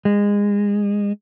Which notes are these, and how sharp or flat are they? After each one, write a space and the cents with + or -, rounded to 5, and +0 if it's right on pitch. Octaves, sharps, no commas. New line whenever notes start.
G#3 -25